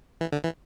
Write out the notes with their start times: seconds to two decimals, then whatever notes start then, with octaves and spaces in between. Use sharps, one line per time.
0.21 E3
0.32 D3
0.44 E3